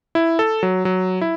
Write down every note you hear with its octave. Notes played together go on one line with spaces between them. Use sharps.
E4
A4
F#3
F#3
E4